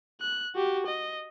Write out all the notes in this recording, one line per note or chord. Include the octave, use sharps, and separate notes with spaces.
F#6
F#4 G4
D#5